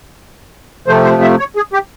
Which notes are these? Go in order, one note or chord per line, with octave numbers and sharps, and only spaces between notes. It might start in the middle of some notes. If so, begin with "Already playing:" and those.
C3 F3 A3 C5
C5
E5
C#5
G#4
G4